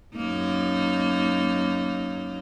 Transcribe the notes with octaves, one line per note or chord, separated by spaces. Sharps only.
F#2 A#3 D#4